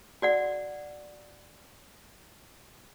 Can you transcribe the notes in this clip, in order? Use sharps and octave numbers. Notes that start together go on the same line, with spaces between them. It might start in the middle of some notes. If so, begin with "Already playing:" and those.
F#4 D5 F#5